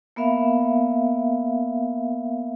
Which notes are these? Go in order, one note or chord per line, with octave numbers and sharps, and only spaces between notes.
A#3 B3 A#4 E5 F5